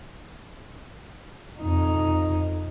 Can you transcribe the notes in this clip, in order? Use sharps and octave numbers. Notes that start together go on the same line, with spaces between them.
F2 D#4